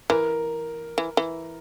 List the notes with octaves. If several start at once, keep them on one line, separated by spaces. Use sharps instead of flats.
E3 A#4
E3
E3